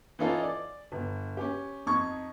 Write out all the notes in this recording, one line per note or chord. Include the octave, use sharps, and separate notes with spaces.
E3 C#4 D#4 F4 A4
D5
G1
C#4 G4
F2 D#4 C#6 G#6